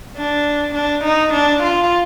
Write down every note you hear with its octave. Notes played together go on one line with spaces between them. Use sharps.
D4
D4
D#4
D4
F4